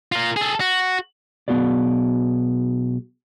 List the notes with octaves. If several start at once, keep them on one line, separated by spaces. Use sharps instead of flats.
F4 A#4
G#4 A4
F#4
B1 B2 B3 F#4 G#4 D5